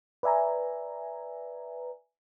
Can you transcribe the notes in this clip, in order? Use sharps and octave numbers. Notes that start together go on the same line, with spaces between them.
B4 D5 E5 G#5 A#5